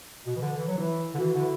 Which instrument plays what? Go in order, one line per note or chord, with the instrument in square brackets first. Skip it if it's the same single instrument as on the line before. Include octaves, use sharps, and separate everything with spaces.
[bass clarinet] B2
E3
D3
E3
F#3
[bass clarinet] E3 [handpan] E4
[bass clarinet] D3
[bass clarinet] E3 [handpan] F#4
[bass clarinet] D3 [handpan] E4